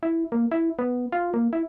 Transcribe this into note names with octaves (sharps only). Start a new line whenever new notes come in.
E4
A#3
E4
B3
F4
A#3
E4